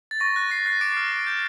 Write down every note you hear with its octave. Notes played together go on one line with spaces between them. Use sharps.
A6
C#6 A#6
F#6 A#6
C#6 C7
F#6 C7
D6 D7
F6
D6
G6